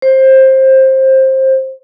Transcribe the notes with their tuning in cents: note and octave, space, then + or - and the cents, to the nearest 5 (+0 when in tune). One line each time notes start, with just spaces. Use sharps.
C5 +20